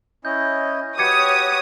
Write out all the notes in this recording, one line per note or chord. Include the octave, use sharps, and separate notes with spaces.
C#4 E4 D#5 G6
F#4 G4 B4 C#5 D6 D#6 G#6 C#7